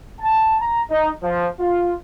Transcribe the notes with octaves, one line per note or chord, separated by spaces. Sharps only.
A5
A#5
D#4
F3
F4